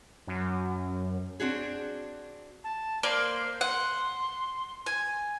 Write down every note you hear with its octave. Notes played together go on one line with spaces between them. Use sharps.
F#2
C4 D4 F#4 G#4
A5
A#3 C5 D5 C6
F#5 C6
G#5